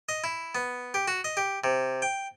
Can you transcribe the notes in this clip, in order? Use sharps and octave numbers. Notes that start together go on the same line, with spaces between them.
D#5
E4
B3
G4
F#4
D#5
G4
C3
G5